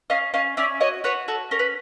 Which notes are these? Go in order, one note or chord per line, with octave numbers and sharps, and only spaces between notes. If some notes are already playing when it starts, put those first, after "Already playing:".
C#4 D#5 F5
C#4 D#5 F5
C#4 D5 E5
F#4 C#5 D#5
F#4 B4 C#5
F#4 A4
C#4 A#4
B4